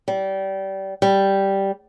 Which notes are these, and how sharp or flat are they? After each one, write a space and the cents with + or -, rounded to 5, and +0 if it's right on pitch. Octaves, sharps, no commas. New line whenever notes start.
G3 -25
G3 -5